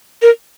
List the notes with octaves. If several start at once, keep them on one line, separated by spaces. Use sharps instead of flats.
A#4